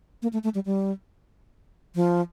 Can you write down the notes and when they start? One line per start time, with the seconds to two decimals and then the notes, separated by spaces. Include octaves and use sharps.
0.22 A#3
0.33 A3
0.44 A3
0.55 G3
0.66 G3
1.95 F3